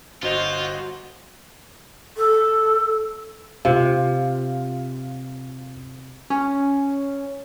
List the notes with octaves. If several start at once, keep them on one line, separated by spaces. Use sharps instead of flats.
G1 F4 F#4 C5 D#5
A4
C3 F4
C#4